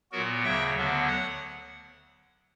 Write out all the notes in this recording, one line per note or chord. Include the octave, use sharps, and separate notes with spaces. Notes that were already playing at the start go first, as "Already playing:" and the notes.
A#2 F#3 B3 F#4 A#4
D2 C#3 F#3 E5 G5
D2 D3 F#3 B3
F#5